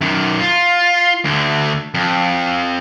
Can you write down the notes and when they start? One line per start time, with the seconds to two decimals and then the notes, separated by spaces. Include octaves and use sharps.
0.01 F#2 D#3
0.40 F4
1.25 D2 D3
1.94 F2